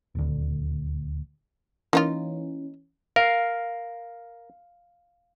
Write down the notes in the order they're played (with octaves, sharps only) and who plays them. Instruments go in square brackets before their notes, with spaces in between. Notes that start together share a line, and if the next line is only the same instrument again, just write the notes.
[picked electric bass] D#1 D2
[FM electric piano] E3 C#4 [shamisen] A#3 D#4 F4
[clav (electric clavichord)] A#4 [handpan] F5